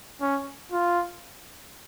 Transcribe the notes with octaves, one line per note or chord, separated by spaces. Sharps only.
C#4
F4